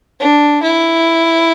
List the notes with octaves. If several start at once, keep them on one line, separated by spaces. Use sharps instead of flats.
D4
E4